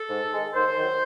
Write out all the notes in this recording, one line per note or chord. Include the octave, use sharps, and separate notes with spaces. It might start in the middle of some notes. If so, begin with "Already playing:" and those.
Already playing: A4
G#2
D#3 G#3
D#2 C5
D#3 F#3